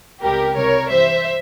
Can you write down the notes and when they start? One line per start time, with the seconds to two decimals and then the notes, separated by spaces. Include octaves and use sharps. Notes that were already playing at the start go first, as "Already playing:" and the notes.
0.22 C#2 C3 G3 G4 A#4
0.56 C2 C3 G3 A#4 C#5
0.90 G2 E3 G3 C5 E5